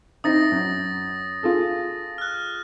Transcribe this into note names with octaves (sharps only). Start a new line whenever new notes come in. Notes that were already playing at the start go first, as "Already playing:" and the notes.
C4 D#4 E4 D#6 A6 A#6
F#2
F4 G#4 A4
F6 F#6